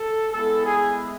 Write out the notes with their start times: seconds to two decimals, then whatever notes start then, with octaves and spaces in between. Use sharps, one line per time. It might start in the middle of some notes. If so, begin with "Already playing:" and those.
Already playing: A4
0.32 G#3 B3 E4 A4
0.65 G#4